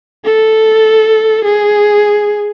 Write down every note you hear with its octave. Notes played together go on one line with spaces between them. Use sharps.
A4
G#4